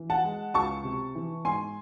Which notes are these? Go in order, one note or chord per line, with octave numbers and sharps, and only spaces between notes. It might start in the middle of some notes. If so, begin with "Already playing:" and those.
Already playing: E3
F#5 A5
G#3
C#2 A5 C#6
C3
E3
G#2 G#5 C6